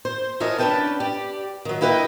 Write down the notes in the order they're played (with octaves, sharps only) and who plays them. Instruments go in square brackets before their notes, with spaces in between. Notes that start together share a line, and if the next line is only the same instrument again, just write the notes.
[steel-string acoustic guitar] C5
E3 A4 A#4 C#5 D#5
C#4 D4 A#4 B4 G5 A5
G4 D5
D#3 F#3
A#3 E4 G4 B4 C5 D#5